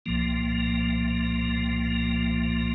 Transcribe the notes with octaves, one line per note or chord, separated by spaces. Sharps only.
C2 A#2 F3 A#3